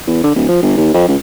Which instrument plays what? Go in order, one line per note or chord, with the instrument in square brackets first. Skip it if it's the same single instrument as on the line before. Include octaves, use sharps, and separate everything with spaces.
[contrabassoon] E2
D3
D1
F3
G1
D#2
F2
C#2